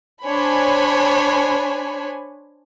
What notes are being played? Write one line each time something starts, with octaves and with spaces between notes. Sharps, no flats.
D4 C5 C#5 G#5 B5